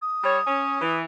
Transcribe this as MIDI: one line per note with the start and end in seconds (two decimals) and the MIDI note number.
0.02 0.95 87
0.24 0.38 55
0.24 0.38 73
0.47 0.79 61
0.82 1.03 52